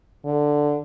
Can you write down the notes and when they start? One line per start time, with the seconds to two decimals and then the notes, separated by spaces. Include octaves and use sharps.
0.25 D3